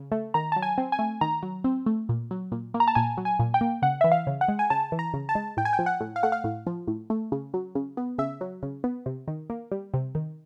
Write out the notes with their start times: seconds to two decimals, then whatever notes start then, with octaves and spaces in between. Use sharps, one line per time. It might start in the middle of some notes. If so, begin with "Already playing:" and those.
Already playing: C#3
0.12 A3
0.34 D#3 A#5
0.52 F#3 A5
0.62 G#5
0.78 C4
0.92 G#5
0.99 A3
1.21 D#3 A#5
1.43 F#3
1.64 C4
1.86 A3
2.09 A#2
2.31 F#3
2.52 A#2
2.74 A#3
2.80 A#5
2.88 A5
2.95 A#2 G#5
3.18 F#3
3.25 G#5
3.40 A#2
3.54 G5
3.61 A#3
3.82 C#3 F#5
4.01 E3 E5
4.12 F5
4.27 C#3
4.41 F#5
4.48 G#3
4.59 G#5
4.70 C#3 A5
4.92 E3
4.99 A#5
5.14 C#3
5.29 A5
5.35 G#3
5.57 A2 G5
5.65 G#5
5.73 G5
5.79 F3
5.86 F#5
6.00 A2
6.16 F5
6.23 A3 F#5
6.32 F5
6.44 A2
6.67 F3
6.88 A2
7.10 A3
7.32 C#3
7.54 F#3
7.75 C#3
7.97 B3
8.18 C#3 E5
8.41 F#3
8.63 C#3
8.84 B3
9.06 C3
9.28 D#3
9.50 A#3
9.72 G3
9.94 C3
10.15 D#3